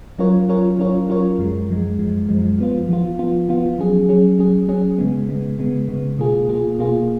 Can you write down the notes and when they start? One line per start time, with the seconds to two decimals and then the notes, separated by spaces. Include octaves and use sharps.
0.18 F#3 C#4 F4 A#4 C#5
0.49 F#3 C#4 F4 A#4 C#5
0.78 F#3 C#4 F4 A#4 C#5
1.09 F#3 C#4 F4 A#4 C#5
1.39 F#2 F3 G#3
1.69 F#2 F3 G#3
1.99 F#2 F3 G#3
2.29 F#2 F3 G#3
2.58 F3 B3 F4
2.88 F3 B3 F4
3.19 F3 B3 F4
3.49 F3 B3 F4
3.79 F#3 C#4 G#4
4.08 F#3 C#4 G#4
4.39 F#3 C#4 G#4
4.68 F#3 C#4 G#4
4.98 C#3 G#3 B3
5.29 C#3 G#3 B3
5.59 C#3 G#3 B3
5.88 C#3 G#3 B3
6.18 B2 A#3 F4 G#4
6.49 B2 A#3 F4 G#4
6.79 B2 A#3 F4 G#4